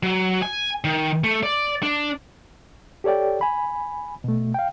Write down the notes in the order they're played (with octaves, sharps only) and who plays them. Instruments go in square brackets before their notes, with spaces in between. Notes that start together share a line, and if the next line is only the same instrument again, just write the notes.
[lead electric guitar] F#3
G#5
D#3
A3
D5
D4
[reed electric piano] G4 A4 C#5 D5 G5
G#5 B5
B2 A3
F5 G5